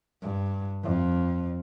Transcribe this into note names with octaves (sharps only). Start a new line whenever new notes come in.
G2
F2